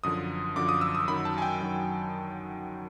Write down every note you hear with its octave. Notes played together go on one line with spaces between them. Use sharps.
F#2 D3 F3 D#6
F#2 D3 F3 D6
D#6
E6
D#6
F#2 D#3 F#3 B5
A5
G#5
G5
F#2 D#3 F#3